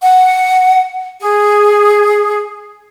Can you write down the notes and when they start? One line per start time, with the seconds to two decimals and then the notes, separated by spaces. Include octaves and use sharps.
0.02 F#5
1.20 G#4